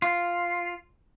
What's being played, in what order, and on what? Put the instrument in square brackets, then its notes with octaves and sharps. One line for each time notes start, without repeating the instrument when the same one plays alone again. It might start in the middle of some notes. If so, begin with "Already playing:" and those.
[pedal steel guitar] F4